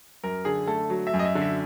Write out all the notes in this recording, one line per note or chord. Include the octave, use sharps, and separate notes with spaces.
F#2 A#4
D3 G#4
A3 A4
F#3
E5
F#2
D#5
E5
D3
E5